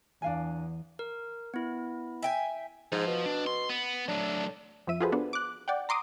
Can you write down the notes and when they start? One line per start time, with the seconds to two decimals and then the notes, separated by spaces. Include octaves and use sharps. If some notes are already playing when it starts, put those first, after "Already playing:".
0.22 E2 D4 F5 G#5
0.99 A#4
1.54 B3 E4
2.22 E5 G5 G#5
2.92 G#2 F3
3.07 B2
3.26 D4
3.47 C6
3.69 B3
4.08 F#3 A3 D4
4.87 F2 F3 E5 D#7
5.01 F4 F#4 G#4 A4 B4 C5
5.12 B3 D4
5.33 D6 F#6
5.68 D5 F#5 G5
5.89 A#5 C6 D6 D#6